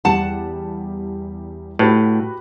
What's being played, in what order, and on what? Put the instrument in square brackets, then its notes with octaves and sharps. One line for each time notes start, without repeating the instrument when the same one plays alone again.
[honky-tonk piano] E2 G3 [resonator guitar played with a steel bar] F#5 A5
[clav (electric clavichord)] A2 [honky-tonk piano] F#4 G4 B4